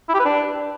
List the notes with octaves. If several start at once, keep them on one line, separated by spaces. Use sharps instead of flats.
E4
G4
B4
D4